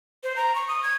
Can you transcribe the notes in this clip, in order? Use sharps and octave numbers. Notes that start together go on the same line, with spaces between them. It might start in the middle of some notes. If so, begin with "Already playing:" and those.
C5
A#5
C#6
D#6
G#6